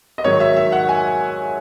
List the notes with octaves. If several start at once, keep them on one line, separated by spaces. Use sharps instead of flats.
D#5
G#2 D#3 F#3 C#5
E5
E5
F#5
G#5